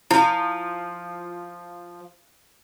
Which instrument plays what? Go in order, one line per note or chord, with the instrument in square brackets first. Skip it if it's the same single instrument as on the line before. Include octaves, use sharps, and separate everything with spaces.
[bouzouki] F3 [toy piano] E4